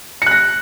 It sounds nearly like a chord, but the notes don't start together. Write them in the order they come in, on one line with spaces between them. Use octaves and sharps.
C#7 F#6 A#6